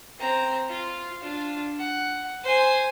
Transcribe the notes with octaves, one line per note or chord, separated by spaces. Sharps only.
C4 A#5
F4
D4 F4
F#5
C5 G#5